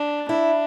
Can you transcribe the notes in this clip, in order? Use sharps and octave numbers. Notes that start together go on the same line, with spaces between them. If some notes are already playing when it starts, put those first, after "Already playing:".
Already playing: D4
D4 E4